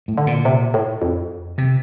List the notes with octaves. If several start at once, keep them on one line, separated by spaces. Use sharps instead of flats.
A2
D3
A#2
C3
A2
F2
C3